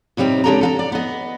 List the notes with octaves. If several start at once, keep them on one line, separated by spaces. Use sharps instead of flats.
A2 C3 G3 C4 D#4
C#3 G#3 D4 G4 A4 A#5
A4 F5 A#5
D5
B3 D#5